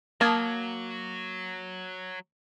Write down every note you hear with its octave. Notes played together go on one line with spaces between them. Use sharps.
F#3 A#3 A5 D#6 G#6